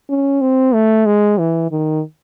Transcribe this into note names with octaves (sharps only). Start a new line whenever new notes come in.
C#4
C4
A3
G#3
E3
D#3